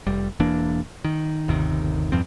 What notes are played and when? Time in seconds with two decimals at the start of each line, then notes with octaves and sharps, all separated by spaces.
0.07 F1 G3
0.40 E1 E3 A#3 D4
1.05 D#3
1.48 G1 D#2 C3 D#3
2.12 E2 G2 F3 C4